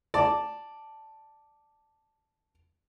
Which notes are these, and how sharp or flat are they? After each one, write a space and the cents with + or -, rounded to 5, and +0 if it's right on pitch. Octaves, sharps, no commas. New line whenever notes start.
D5 +0 A5 +0